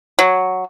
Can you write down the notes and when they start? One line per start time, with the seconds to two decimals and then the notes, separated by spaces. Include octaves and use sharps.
0.19 F#3